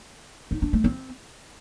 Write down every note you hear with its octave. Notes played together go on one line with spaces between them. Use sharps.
D#4
D4
A3
C4